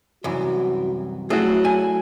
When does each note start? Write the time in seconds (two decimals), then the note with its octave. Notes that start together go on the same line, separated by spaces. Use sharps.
0.24 C2 F#2 E3 F#4
1.30 F#3 A3 E4 F#4 G#4
1.65 G#5